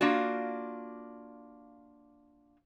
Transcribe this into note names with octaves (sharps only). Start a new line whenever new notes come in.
A#3 D4 F4 F#4